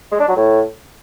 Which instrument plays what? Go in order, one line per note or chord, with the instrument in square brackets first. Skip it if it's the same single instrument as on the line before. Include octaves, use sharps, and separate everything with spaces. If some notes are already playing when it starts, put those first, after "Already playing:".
[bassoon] G#3
D4
F#3
A2